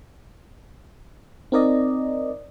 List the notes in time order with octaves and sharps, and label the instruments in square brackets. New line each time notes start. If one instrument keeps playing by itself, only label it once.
[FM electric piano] C4 D#4 A#4 D5 D#5